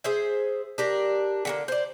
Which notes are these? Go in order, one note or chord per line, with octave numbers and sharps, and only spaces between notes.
G#4 C5 E5
D4 G4 A#4
D3 F#3 A#3
C5 D5